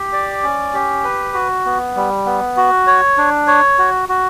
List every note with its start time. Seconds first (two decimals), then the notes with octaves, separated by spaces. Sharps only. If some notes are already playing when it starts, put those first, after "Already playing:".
Already playing: G4
0.13 D5
0.43 C#4
0.73 G4
1.04 B4
1.34 F#4
1.65 B3
1.96 G3
2.26 B3
2.57 F#4
2.87 C#5
3.18 D4
3.47 C#5
3.78 F#4
4.09 F#4